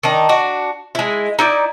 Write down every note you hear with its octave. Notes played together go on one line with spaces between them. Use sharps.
D#3 D4 D#4
D4 F#4
G#3 E4
D#4 E4 D5